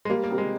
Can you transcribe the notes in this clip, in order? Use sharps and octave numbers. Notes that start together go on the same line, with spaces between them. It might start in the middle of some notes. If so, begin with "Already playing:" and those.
G#3
G3 A#3
A#3
C4 G4 A#4
G#3